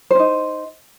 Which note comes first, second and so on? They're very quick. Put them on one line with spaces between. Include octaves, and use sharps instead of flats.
C5 C#4 D#4